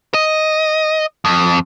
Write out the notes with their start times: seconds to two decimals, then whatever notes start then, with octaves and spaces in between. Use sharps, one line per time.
0.14 D#5
1.25 F2